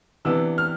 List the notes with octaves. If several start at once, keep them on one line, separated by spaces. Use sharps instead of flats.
C3 E3 B3 D4 E6
F6